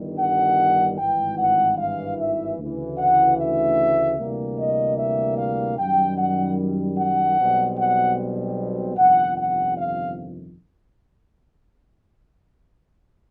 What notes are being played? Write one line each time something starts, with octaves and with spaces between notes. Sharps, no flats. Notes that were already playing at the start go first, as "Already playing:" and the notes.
Already playing: G1 G2 D#3 G3
F#5
G#1 G2 E3 G5
F#5
F5
E5
D2 C#3 E3
F#5
E5
D2 C3 E3 G3 A#3
D#5
E5
F5
F#2 D#3 G3 G5
F#5
F#5
B1 B2 G3 C4
F#5
G1 F2 C3 D#3 F#5
F#5
F5